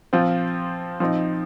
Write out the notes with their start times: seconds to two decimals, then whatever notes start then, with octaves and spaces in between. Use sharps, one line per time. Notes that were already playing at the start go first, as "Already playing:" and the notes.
0.13 F3 C4 F4
1.00 F3 C4 D#4